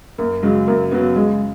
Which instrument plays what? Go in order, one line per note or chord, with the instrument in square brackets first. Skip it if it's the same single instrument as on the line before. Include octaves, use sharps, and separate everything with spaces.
[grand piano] F#2 [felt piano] A#3
[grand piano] C#3 F#3 [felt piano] G#3
[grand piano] F#2 [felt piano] A#3
[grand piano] C#3 F#3 [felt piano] B3
[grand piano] C#3 [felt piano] G#3